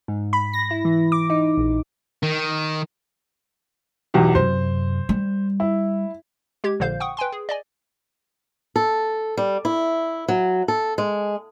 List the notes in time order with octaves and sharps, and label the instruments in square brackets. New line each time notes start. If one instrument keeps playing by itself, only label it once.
[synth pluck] G#2
B5
A#6
E4
E3
D6
D#4
A#1
[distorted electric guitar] D#3
[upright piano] B1 E2 G4
[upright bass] F#2 C3 [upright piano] C5
[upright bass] G3
[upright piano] E4
[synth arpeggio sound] G#3 G4 G#6
A#1 A#2 D3 C5 F5 G6
F#5 G5 C#6 D#6
B4 G5 G#5 C6
G#4
D5 D#5 G#5
[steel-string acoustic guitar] A4
G3
E4
F#3
A4
G#3